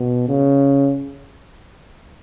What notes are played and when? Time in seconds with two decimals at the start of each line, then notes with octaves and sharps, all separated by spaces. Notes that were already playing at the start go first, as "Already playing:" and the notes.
Already playing: B2
0.28 C#3